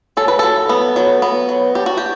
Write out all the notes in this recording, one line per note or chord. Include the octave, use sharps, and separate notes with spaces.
F#3 A4
B4
F#3 A4
B3
F#3
B3
F#3
D4 G4
F#4
G4